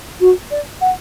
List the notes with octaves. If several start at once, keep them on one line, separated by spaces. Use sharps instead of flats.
F#4
D5
F#5